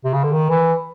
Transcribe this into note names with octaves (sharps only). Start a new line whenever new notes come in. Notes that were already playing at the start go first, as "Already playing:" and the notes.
C3
C#3
D3
D#3
E3